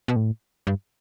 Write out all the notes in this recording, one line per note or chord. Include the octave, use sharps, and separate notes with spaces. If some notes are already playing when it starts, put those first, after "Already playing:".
B2
A2
G2